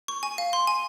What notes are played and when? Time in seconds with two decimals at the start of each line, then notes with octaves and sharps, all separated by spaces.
0.08 C#6
0.23 G#5
0.38 F5
0.53 C6
0.67 G#5